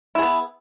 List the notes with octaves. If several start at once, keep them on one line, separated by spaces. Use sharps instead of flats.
B3 E4 G#4